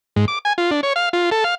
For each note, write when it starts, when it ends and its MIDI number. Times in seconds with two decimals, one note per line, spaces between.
0.16 0.25 44
0.28 0.39 86
0.45 0.53 80
0.58 0.71 65
0.71 0.81 62
0.83 0.93 73
0.96 1.09 77
1.13 1.30 65
1.31 1.44 69
1.44 1.55 77